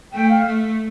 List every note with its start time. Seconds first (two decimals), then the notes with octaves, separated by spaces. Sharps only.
0.13 A3 G5
0.30 F5
0.46 A3